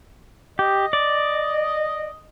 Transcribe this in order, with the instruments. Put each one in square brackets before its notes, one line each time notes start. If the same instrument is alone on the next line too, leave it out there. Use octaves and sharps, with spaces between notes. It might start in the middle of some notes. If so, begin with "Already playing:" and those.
[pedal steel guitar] G4 [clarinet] D#5
[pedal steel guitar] D5